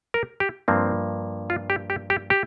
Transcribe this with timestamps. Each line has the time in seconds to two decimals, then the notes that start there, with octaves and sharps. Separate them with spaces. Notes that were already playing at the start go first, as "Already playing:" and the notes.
0.14 A#4
0.40 G4
0.68 G2 F3 A#3 C4
1.50 F4
1.70 G4
1.90 G4
2.10 G4
2.30 G4